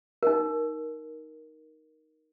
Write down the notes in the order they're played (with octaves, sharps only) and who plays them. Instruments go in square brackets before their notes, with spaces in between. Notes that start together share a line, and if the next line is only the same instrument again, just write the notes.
[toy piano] D#4 A#4